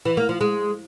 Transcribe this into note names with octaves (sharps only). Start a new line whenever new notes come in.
E3
A#3
F3
G#3